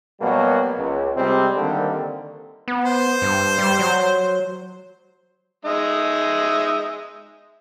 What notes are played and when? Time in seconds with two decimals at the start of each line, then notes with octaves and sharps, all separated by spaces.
0.20 B2 F#3 G3 A#3 B3
0.78 C#2
1.16 C3 G3 G#3 C4
1.55 D3 D#3 G3 A#3 C4
2.68 B3
2.85 C5
3.22 G2
3.59 G3
3.79 F#3
5.65 G#3 D#4 E5